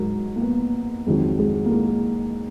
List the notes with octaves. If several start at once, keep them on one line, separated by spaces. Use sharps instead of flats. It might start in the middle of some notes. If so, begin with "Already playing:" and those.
Already playing: G#2 F#3 A#4
A#3
B3
F2 D#3 F#3 G#3
G#3
A#3
G#3